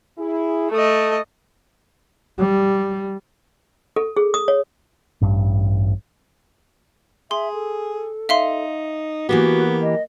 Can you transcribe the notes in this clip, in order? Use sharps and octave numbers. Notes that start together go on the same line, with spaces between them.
E4 G#4
A3 A4 D#5
G3
A4
G#4
D#6
C#5
A1 G2
G#4 E5 C6
A4
D#4 E5 F5 C6
E3 A#3 B3 F#4 G4
D#5